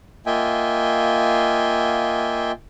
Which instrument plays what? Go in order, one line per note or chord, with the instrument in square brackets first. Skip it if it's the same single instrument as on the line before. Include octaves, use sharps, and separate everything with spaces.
[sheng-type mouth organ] A#3 F4 D#5 E5 G5 G#5